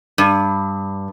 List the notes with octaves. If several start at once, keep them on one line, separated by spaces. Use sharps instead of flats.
G2